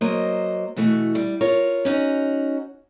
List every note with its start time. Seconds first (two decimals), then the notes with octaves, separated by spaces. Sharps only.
0.01 F#3 A#3 C5 D#5
0.76 B2 E3 A3 F#4
1.15 G3
1.41 F4 A#4 C#5
1.85 C#4 D#4 F#4